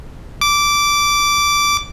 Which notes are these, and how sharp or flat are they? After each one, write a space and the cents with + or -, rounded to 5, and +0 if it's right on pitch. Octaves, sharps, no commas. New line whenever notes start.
D6 -10